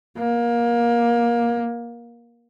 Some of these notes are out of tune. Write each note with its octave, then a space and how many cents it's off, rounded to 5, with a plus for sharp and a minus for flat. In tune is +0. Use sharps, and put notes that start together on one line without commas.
A#3 +20